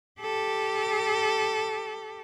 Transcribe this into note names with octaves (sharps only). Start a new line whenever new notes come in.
G4 A4